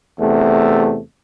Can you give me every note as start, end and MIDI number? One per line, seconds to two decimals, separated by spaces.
0.20 0.99 40
0.20 0.99 48
0.20 0.99 57